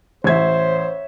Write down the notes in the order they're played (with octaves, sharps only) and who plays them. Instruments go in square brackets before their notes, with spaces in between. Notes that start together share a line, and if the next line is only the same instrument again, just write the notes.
[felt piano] A1 G#6 [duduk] C5 [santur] C#5 E5